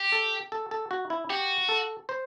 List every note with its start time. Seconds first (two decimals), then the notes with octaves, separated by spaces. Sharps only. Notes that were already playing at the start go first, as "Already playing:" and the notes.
Already playing: G4
0.12 A4
0.52 A4
0.71 A4
0.91 F#4
1.10 E4
1.30 F#4 G4
1.69 A4
2.09 C5